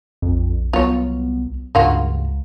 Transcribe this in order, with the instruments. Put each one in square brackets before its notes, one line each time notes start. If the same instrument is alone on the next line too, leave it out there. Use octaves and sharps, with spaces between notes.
[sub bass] A#1 [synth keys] F2
[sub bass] C2 [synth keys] F#3 B3 [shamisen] F4 C#5
[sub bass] C#2 [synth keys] G2 C#3 [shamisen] A#3 F4 F#4